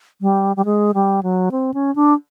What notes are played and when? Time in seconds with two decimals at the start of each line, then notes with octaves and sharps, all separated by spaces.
0.21 G3
0.56 G3
0.65 G#3
0.94 G3
1.23 F#3
1.52 C4
1.74 C#4
1.96 D4